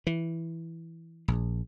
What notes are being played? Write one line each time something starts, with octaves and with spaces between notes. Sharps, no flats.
E3
A#1